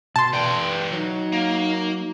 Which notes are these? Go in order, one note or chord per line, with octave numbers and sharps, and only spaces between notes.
B2 A5 C6
E3 B4 D5 G5
F#3 D#4
A#3